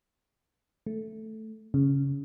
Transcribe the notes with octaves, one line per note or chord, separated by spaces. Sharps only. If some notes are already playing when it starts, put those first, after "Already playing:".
A3
C#3